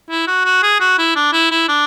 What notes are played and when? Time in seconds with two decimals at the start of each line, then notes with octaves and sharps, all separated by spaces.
0.10 E4
0.27 F#4
0.45 F#4
0.62 G#4
0.80 F#4
0.98 E4
1.16 D4
1.33 E4
1.51 E4
1.68 D4